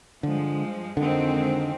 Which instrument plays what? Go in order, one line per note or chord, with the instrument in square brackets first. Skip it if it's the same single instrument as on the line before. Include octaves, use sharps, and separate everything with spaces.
[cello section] G2 F3 G#3 [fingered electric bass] D3
[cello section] F2 D#3 G#3 C4 [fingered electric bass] D3